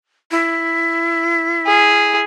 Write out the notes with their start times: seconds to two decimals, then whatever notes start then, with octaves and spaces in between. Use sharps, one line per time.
0.31 E4
1.66 G#4